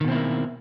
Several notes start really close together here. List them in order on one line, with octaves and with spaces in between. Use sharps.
D#3 B2 C4 E4 A#3